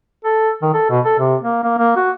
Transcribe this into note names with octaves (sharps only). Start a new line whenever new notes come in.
A4
D#3
A4
B2
A4
C3
A#3
A#3
A#3
F#4